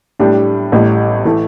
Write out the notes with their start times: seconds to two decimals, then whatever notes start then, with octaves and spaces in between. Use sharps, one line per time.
0.19 A2 G3 D4 G4
0.72 A1 A2 G3
1.25 A2 E3 A3 E4